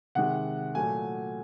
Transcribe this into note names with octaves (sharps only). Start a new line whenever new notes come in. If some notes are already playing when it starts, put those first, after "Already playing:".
C3 D#3 G#3 F#5
A#2 F#3 A3 G#5